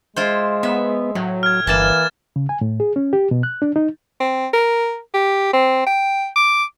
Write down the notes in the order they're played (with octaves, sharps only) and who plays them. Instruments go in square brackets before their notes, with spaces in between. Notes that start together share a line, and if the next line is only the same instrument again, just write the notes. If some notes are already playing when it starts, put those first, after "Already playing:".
[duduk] G#3 [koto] E4 F4 C5
[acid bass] B3 [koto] E5
[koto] A2 [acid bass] F#3
[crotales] F6 G#6
[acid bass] G1 [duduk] E3 [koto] A#3 A5 [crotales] G#6 A6 E7
[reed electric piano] C#3
G#5
A2
G#4
C#4
G4
B2
F#6
D4
D#4
[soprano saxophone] C4
A#4
G4
C4
G5
D6